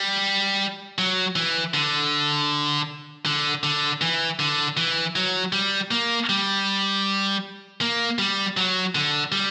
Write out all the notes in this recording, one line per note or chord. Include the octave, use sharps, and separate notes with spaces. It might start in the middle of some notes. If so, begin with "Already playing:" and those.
Already playing: G3
F#3
E3
D3
D3
D3
E3
D3
E3
F#3
G3
A#3
G3
A#3
G3
F#3
D3
G3